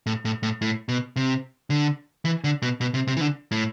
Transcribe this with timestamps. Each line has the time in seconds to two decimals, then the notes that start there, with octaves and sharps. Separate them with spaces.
0.06 A2
0.25 A2
0.43 A2
0.62 A2
0.89 B2
1.16 C3
1.70 D3
2.25 E3
2.44 D3
2.62 B2
2.81 B2
2.94 C3
3.07 C3
3.17 E3
3.21 D3
3.51 A2